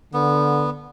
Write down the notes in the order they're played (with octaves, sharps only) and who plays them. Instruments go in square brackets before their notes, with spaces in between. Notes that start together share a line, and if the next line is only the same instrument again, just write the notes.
[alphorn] D3 [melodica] B3